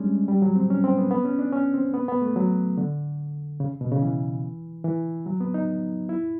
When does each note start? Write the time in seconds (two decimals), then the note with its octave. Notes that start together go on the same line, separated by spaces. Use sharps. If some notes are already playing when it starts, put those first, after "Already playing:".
Already playing: G3 G#3 C#4 D4
0.28 G3
0.42 F#3
0.56 C4
0.70 C#4
0.84 C4
0.98 B3
1.11 B3
1.25 C#4
1.39 D4
1.52 C#4
1.74 C4
1.94 B3
2.08 B3
2.22 A3
2.36 F#3
2.78 D3
3.60 C#3
3.81 B2
3.91 C#3
4.02 E3
4.84 E3
5.26 F#3
5.40 B3
5.54 D#4
6.09 E4